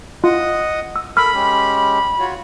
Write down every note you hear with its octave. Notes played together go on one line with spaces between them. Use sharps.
F4 D#5 F#5 D#6
E6
A4 A#4 B5 E6 F6
G#3 C#4 G4
F4 F#4 C#5